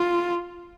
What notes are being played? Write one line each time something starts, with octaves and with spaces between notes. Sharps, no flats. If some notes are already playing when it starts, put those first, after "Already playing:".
Already playing: F4